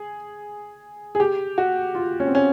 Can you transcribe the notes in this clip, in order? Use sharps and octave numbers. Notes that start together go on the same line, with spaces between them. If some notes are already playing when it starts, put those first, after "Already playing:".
Already playing: G#4
G#4
G4
F#4
F4
C#4
C4
C#4